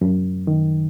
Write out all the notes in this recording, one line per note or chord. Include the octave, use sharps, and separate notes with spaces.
F#2
D#3